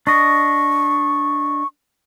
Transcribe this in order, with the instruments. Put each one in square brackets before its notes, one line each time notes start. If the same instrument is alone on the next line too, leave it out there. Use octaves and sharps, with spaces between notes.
[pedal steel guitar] D4 D#5 [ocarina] C#6